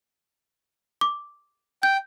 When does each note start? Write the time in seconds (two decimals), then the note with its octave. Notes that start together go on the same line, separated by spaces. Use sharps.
1.01 D6
1.83 G5 G6